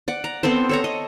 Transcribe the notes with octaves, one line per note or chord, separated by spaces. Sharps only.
D5 F#5
A#5
B3 C4 A4 C5
A4 C#5 A#5
D#5